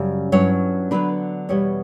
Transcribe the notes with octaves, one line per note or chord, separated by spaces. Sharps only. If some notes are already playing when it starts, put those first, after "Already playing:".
Already playing: F#2 C#3 G3
G2 F#3 C#4 E4 C#5
D3 F#3 B3 D4 B4
E2 B2 G3 B3 C#5